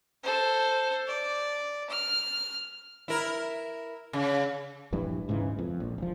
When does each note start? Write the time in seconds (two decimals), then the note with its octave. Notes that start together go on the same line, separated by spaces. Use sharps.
0.23 A4 C5
1.07 D5
1.90 F6
3.08 E4 A#4
4.13 C#3
4.92 A#1 G2 E3
5.28 D#1 G#2 C#3 E3
5.59 F2
5.80 A#1
5.98 E1 F3